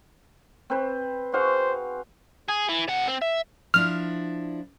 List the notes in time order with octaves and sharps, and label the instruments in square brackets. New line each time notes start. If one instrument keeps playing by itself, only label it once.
[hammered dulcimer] C4 B4 C5
[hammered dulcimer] F#4 G#4 F5 [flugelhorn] C5
[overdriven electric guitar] G#4
E3
C3 F#5
C4
E5
[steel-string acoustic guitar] F3 D4 E4 [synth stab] F6